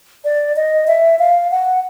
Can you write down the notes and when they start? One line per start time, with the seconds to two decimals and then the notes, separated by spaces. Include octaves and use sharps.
0.24 D5
0.56 D#5
0.87 E5
1.19 F5
1.51 F#5